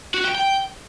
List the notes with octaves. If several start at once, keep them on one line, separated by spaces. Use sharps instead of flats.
F#4
G5
G5